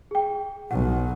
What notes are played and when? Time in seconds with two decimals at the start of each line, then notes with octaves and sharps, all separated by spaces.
0.11 G#4 G5
0.71 B1 F#5